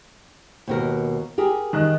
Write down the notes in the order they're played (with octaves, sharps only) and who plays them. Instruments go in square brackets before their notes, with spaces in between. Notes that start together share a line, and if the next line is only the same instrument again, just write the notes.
[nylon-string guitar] D#2 B2 A#4
G4 G#4 A#4
[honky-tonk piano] D#3 D#5 F#6